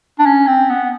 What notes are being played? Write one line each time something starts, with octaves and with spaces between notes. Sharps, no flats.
D4
C#4
C4
B3